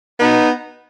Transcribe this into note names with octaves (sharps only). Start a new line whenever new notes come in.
B2 B3 D#4